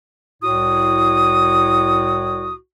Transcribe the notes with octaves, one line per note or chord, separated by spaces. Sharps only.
C2 A2 E4 F#4 D#6